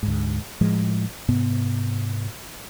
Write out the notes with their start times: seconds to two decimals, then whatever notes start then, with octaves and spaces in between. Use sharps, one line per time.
0.03 D2 G#2
0.61 A2 F3 G#3
1.28 G#2 C3 B3